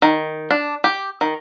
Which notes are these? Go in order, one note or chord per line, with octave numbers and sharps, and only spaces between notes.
D#3
D4
G4
D#3